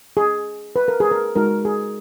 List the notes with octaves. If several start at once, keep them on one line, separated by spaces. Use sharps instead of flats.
G#4
B4
A#4
G#4
A#4
G#3 D#4 F#4 A#4
G#4